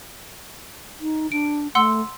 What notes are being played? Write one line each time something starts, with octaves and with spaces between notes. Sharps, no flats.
D#4
D4 D7
A3 F#5 C6 E6